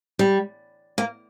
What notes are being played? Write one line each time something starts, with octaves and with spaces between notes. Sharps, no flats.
G3
A#3